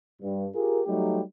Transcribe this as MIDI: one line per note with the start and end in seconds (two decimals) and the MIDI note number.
0.22 0.46 43
0.55 0.80 65
0.55 0.80 67
0.55 0.80 68
0.55 0.80 70
0.86 1.22 54
0.86 1.22 55
0.86 1.22 57
0.86 1.22 63
0.86 1.22 67